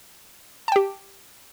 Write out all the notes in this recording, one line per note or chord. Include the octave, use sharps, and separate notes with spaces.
G4 G5 A5